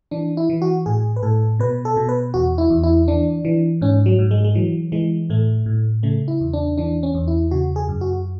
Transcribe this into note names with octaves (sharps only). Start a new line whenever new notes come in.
E3 D4
E4
E3
F#4
A2 G#4
B4
A2 A4
B2 B4
A4
B2
B4
E2 F#4
E4
E2
E4
E3 D4
E3
G#2 C#4
F#3
G#2
G#3
G#3
E3 F#3
E3 G#3
A2 A3
A2
C#3 A3
E4
E2
D4
E3 D4
C#4
E2
E4
C#3 F#4
G#4
F#2
F#4